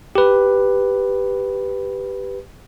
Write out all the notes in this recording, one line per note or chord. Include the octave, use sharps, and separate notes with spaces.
G4 B4